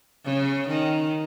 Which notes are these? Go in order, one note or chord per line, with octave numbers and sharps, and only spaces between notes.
C#3
D#3